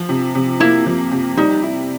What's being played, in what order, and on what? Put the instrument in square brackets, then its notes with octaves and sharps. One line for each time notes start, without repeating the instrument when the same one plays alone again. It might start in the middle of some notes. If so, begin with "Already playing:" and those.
Already playing: [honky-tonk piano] F3
C3
C3
[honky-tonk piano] A#3 [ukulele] E4
[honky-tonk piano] F3
C3
[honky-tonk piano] G3 [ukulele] D#4
[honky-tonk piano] E4